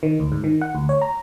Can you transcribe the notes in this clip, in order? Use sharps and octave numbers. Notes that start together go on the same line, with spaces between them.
D#3
D2
G#2
D#3
F#5
D2
C#5
A#5